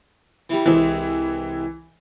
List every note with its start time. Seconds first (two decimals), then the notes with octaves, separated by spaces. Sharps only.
0.50 E3 G3
0.66 C2 C3 E3 G#3